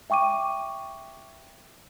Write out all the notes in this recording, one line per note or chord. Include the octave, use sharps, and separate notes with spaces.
E5 G5 C#6 D6 D#7